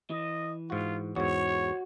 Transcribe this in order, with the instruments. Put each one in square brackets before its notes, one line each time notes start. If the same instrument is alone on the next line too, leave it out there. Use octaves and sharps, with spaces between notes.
[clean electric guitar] E3 [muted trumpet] D#5
[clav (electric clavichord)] G#2 F#4 [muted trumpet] F4
[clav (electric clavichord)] E2 G#2 [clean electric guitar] F#4 [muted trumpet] C#5